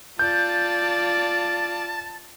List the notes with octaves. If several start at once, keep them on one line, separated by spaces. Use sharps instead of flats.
F4 D5 A5 G6